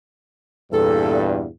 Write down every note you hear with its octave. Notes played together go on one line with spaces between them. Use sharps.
E2 G2 A#2 A4